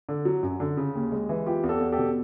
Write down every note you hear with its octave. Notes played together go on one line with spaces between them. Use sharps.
D3
F#3
F#2
D3
C#3
D#2
G#3
E3
B3 F4 G4
E2
G4 A4
E2
G4 A4
B2